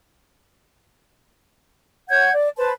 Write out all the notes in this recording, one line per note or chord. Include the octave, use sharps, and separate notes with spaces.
C#5 F#5 G6 G#6
D5
B4 C5 A5